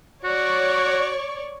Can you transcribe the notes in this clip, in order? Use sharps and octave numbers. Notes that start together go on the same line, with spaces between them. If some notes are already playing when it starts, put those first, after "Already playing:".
F#4 C#5 D5 C#6